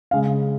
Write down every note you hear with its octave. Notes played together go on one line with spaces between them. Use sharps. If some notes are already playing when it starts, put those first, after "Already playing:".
C#3 G#3 F5